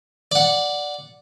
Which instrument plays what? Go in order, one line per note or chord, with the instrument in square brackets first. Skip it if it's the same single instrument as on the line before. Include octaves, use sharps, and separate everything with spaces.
[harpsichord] D5 F#5